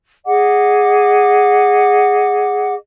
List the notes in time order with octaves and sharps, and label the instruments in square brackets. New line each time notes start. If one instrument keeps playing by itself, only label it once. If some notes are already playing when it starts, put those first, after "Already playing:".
[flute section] G#4 D#5 F#5 D6